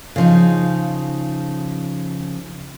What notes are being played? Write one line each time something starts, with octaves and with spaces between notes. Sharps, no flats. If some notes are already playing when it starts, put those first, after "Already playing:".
C#3 F3 D#4